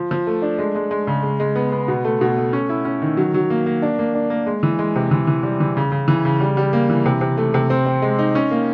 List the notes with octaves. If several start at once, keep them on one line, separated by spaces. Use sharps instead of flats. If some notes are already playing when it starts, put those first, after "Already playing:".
Already playing: F3
F3
A3
D4
G#3
G#3
G#3
C#3
G#3
G#3
B3
B3
B2
A3
B2
A3
C#4
E4
C#4
D#3
F#3
F#3
A#3
A#3
D4
A#3
D4
A#3
G#3
E3
G#3
C3
E3
E3
G3
E3
C#3
C#3
E3
C#3
G3
G3
A#3
E3
C3
C3
A3
C3
C4
C4
G#3
D#4
C#4
A#3